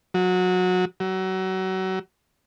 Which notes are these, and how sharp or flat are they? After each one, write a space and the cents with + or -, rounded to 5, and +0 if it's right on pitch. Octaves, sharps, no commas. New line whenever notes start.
F#3 -20
F#3 +30